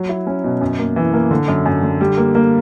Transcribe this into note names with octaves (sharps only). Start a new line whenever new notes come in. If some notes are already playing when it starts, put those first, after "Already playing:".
Already playing: F#3
E4
C#4
B2
F#2
A#3
E3
A#3
D3
F#2
F#2
D3
G3
A#3
A#3